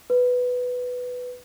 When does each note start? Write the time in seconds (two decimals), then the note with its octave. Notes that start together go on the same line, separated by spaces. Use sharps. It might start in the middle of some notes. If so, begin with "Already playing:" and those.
0.10 B4